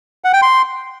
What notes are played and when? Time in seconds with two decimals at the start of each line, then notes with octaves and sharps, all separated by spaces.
0.24 F#5
0.33 G5
0.42 C6